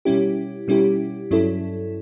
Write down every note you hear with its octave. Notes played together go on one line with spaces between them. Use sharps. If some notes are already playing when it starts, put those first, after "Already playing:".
B2 G3 C#4 E4 G4
B2 G3 C#4 E4 G4
G2 F#3 C#4 E4 A4